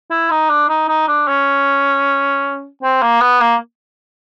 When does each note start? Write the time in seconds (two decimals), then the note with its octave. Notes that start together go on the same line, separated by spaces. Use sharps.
0.11 E4
0.31 D#4
0.50 D4
0.69 D#4
0.88 D#4
1.08 D4
1.28 C#4
2.83 C4
3.02 A#3
3.21 B3
3.41 A#3